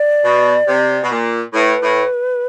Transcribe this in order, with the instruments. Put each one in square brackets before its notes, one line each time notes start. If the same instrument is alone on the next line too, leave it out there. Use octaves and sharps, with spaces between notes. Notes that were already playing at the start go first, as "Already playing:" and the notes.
Already playing: [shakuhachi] D5
[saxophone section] B2
C3
B2
A#2
[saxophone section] A2 [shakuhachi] B4
[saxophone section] A2